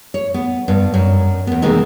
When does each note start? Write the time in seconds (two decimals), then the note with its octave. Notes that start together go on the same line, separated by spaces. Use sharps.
0.14 C#5
0.34 B3
0.68 G2 B3
0.94 F#2
1.47 E2 B3
1.62 C3 D#3 E3 G#3 A#3 B3